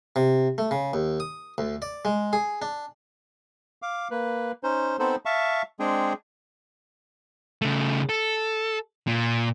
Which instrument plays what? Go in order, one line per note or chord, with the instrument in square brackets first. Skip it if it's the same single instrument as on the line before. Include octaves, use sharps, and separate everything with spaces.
[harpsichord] C3
A3
C#3
D#2
D#6
D2
D5
G#3
G#4
D4
[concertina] F5 D6
A#3 B4
C#4 D#4 C5
B3 C4 D#4 A4 C5
E5 F5 A5 C#6
G#3 C4 D4 G#4 G5
[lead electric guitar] C#3 A3
A4
A#2